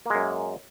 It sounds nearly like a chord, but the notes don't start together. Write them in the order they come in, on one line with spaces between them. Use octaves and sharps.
A#3 G#3 F#2